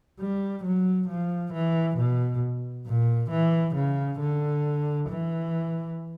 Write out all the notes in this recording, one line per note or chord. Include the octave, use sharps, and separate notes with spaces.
G3
F#3
F3
E3
B2
A#2
E3
C#3
D3
E3